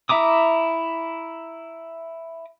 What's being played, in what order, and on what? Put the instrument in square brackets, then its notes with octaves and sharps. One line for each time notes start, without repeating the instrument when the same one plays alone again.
[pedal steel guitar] E4 E5 A#5 D6 D#6